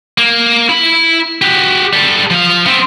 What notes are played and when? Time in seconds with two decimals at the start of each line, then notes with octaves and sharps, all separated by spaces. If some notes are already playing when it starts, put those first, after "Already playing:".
0.18 A#3
0.69 E4 B5
1.42 F#4 G4
1.93 G3 A4
2.30 F3 F5
2.66 B3 C4